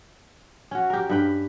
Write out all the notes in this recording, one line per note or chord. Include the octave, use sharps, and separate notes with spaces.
C#4 F#4
G4 A#4
G2 B4 G5